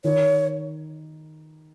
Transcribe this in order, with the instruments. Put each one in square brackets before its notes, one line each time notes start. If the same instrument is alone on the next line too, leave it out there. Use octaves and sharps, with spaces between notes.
[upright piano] D#3 [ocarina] C#5